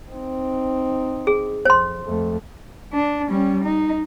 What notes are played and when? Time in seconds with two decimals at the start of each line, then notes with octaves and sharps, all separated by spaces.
0.11 C4 D#4
1.27 G#4
1.65 F2 C5 C6
2.05 F2 A3
2.93 D4
3.29 G3 C#4
3.64 D#4